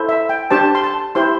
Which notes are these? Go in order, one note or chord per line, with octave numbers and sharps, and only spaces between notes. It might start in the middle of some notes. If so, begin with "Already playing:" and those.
Already playing: E4 A4 C5
E5
G5
D4 G4 C5 A5
C6
A5
E4 G4 C5 C6